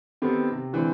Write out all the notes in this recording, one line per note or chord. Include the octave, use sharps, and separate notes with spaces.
D#3 B3 C4 G4 A4 C5
C3
D3 E3 G#3 C4